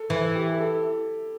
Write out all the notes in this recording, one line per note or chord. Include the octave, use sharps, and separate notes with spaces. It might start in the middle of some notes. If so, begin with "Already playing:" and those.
Already playing: A4
E3
G4
A4
A4